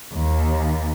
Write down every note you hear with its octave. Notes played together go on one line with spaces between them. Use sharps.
D#2